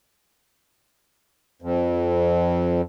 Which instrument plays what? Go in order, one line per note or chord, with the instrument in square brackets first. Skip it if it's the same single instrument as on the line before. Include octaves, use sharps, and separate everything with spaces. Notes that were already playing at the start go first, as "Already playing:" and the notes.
[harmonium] F2